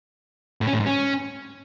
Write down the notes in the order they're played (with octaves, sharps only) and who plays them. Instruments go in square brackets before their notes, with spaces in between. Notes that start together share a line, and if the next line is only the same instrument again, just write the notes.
[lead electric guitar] A2
C#4
A2
G#2
C#4